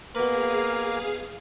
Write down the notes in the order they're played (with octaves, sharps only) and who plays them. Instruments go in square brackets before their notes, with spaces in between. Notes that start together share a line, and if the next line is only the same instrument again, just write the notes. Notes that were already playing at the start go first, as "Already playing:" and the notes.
[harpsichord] B2 B4 [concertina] A#3 A#4 [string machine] G#4 F5